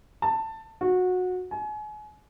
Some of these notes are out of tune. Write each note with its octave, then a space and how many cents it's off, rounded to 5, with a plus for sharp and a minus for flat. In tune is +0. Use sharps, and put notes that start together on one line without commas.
A5 +15
F#4 -20
G#5 +35